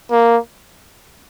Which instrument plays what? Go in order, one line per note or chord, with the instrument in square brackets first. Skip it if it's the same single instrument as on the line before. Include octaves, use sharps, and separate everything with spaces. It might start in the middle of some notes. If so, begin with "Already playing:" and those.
[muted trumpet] A#3